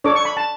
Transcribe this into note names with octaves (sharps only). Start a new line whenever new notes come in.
D4 A4 C#5 D6
C#6
B5
A5